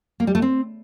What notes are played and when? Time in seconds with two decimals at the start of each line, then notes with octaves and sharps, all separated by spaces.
0.20 A#3
0.27 G3
0.35 A3
0.42 C4